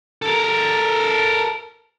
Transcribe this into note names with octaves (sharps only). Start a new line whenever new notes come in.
A4 A#4